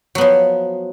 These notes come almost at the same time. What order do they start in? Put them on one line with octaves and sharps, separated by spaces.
F#3 B3 F3